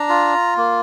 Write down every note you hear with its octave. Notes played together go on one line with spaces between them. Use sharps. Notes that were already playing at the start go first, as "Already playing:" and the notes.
Already playing: D4 A#5
F4
A#3